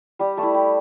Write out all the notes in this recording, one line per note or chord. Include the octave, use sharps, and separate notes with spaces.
G3 G4
A3 A4
E4
G4